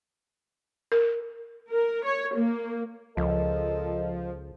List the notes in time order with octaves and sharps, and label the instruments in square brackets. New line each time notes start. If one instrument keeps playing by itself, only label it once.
[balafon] A#4
[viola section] A#4
C#5
A#3
[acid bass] C#2 [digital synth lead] F3 [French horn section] A4 A#4 D#5